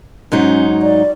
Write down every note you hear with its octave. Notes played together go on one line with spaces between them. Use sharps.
G#2 F#3 C#4 D#4
D5